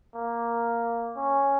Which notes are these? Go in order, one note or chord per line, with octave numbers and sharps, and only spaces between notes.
A#3
C#4